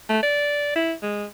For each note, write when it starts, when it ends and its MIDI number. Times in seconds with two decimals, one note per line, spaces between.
0.10 0.20 57
0.23 0.73 74
0.75 0.93 64
1.02 1.25 56